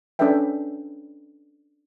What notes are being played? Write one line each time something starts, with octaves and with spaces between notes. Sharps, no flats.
C#4 D4 A4 B4 E5 G5